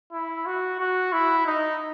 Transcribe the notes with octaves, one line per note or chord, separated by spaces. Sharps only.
E4
F#4
F#4
E4
D#4